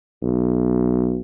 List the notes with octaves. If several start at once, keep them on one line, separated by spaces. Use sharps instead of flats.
B1